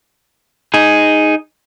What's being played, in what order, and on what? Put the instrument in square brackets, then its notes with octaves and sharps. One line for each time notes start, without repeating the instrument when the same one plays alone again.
[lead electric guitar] D#4 G#4